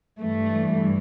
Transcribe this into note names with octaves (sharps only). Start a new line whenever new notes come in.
G2 E3 A3